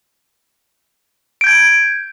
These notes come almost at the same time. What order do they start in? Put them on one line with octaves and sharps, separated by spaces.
D7 G6 G#6